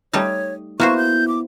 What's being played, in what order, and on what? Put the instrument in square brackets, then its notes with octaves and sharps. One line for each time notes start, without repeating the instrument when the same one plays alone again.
[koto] G3 A3 D#4 [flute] C#5
[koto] A#3 F#4 C5 [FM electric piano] B3 E4 [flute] C#6
[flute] G6
D6